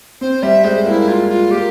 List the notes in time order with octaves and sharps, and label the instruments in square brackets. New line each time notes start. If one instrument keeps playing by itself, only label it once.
[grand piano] C4 [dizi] C5
[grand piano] G3 [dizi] E5
[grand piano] G#3 [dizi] C5
[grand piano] A#3 [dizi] E4
[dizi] F4
F4
[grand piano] A#3 [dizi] G4